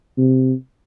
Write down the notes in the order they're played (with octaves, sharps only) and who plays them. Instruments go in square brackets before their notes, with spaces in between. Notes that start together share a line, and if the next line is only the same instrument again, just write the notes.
[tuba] C3